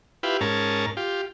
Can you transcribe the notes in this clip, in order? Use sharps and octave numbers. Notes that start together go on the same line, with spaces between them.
E4 F4 G4 B4
G#2 C#4 A#4 A5
F4 G4